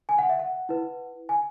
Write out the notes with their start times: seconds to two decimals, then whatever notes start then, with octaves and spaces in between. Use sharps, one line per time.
0.09 G#5
0.18 F#5
0.29 E5
0.39 F#5
0.69 E4 B4
1.29 G#5